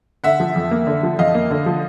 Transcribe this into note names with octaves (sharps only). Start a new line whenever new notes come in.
D3 E5 F#5
F3
F2
A#3
D3
F3
F2 D#5 F5
A#3
D3
F3